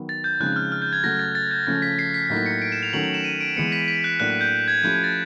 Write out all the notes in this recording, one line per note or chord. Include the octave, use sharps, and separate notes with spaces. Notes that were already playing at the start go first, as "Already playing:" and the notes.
Already playing: D#3 F#3 B3
A6
G6
C#3 F3 G#3 C4 D#4 F#6
F6
F6
G6
G#6
C#3 F#3 A3 A#6
A6
A6
G6
C#3 F3 A3 C#4 A6
B6
C7
B6
A2 F#3 A#3 D#4
C#7
D7
E7
F7
D#3 F#3 A3 C#4 F#7
F#7
E7
D#7
D7
E3 G#3 B3 C#7
B6
B6
F#6
A2 F#3 A#3 D4 F#6
F#6
G6
G#6
F3 A3 C#4 E4 G4 G6
G#6
A6